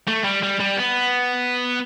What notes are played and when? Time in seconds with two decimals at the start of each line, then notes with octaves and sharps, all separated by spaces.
0.08 A3
0.25 G3
0.43 G3
0.60 G3
0.77 B3